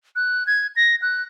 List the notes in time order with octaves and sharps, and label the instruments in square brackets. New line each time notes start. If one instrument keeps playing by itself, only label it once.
[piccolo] F#6
G#6
A#6
F#6